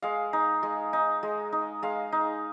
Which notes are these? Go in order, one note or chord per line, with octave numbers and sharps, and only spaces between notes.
G#3 F5
D#4
G#3
D#4
G#3
D#4
G#3 F5
D#4